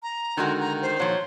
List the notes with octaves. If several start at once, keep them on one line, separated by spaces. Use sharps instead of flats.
A#5
D3 D#3 G#3 F#4
A#5
C5
A#2 F3 F#3